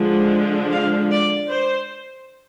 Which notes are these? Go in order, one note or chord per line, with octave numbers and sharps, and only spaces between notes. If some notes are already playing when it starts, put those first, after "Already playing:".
Already playing: D3 F3 G#3 D4
F5
D5
C5